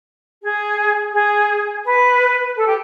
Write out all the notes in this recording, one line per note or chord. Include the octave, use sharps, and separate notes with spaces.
G#4
G#4
B4
A4
G4